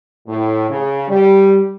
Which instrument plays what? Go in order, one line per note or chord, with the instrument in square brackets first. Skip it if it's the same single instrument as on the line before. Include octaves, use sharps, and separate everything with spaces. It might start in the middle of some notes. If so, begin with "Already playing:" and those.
[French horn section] A2
C#3
G3